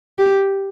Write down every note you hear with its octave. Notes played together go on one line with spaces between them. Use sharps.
G4